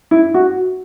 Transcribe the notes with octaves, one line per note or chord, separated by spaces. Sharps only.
E4
F#4